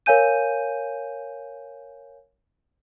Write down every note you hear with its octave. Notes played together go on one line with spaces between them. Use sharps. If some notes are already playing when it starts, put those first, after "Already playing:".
A#4 C#5 F5 G#5 G6 D#7